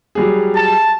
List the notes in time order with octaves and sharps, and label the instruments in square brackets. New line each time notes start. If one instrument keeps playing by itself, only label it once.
[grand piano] F#3 G3 G#4
[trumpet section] A5